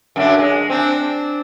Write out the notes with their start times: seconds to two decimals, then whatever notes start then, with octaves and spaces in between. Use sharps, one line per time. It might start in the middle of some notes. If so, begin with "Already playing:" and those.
0.16 F#2 D3 D4
0.39 G#3
0.70 C4 D4